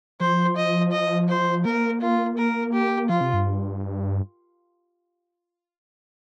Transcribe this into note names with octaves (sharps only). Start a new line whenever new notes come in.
F3 C5
D#5
D#5
C5
A#3 A#4
F4
A#4
G4
F3 F4
C3
G2